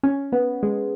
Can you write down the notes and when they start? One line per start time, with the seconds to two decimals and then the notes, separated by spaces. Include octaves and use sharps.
0.03 C#4
0.32 B3
0.63 G#3